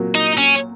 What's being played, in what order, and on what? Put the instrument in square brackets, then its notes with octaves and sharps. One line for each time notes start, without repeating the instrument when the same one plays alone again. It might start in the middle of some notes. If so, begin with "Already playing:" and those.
Already playing: [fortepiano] A#2 F#3 A#3
[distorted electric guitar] D#4
C#4